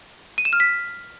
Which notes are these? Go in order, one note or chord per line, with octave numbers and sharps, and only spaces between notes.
D#7
E7
F6
B6